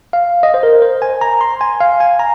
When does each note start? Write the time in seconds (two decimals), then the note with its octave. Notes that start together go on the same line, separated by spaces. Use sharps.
0.13 F5
0.43 D#5
0.54 C5
0.63 A#4
0.82 C5
1.02 G#5
1.21 A#5
1.41 C6
1.61 G#5
1.80 F5
2.00 G#5
2.19 A#5